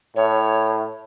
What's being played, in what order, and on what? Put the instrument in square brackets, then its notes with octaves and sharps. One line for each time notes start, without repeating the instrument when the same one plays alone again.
[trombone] A2 [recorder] C#5